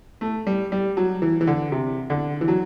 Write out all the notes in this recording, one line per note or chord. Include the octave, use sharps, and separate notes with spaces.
A3
G3
G3
F#3
E3
E3
D3
C3
D3
E3
F#3